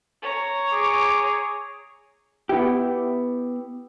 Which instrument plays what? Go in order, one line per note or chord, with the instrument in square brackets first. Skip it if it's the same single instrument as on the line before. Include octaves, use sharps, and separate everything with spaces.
[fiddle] C#5 A#5
[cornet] G#4 [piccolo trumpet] D6
[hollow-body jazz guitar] B3 E4 G4